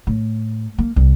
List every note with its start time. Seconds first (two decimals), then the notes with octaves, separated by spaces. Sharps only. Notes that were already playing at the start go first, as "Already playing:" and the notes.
0.07 A2
0.78 A#3
0.96 C2